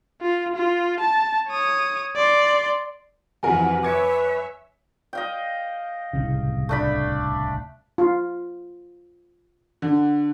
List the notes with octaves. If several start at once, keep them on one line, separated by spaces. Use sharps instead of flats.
F4
F4
A5
C#5 D#6
D5 C6
F2 C3 E3 F#4 A#4 B4 G#5
B4 C#5 E5 D6 G#6 C#7
D#5 F5 G5
D1 C2 C#3
A3 D4 B5
F4
D3